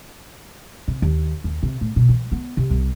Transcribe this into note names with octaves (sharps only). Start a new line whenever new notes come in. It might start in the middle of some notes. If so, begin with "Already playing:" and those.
C3
D#2
D#2
C3
A2
B2
E3
B3
C3
C2